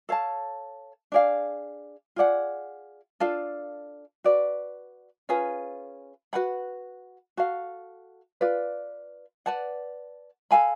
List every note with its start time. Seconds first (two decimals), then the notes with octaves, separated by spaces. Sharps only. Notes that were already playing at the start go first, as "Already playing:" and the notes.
0.09 A4 C#5 F5 A5
1.12 D4 G#4 D5 F5
2.16 F4 G#4 D5 F#5
3.20 D4 F4 A4 F5
4.24 F#4 B4 D5
5.29 C#4 F4 G#4 B4
6.33 F#4 B4 F#5 B5
7.37 F#4 A4 F5
8.41 F4 B4 D5
9.46 B4 D5 F#5 A5
10.51 A4 F5 G#5 B5